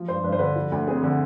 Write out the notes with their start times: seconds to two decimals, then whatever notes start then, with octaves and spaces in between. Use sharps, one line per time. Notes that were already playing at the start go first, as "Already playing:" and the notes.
Already playing: F3
0.08 G2 C5
0.24 G2 B4
0.32 C5
0.39 D3 B4
0.56 F3
0.72 D2
0.87 C4 G#4
1.03 D3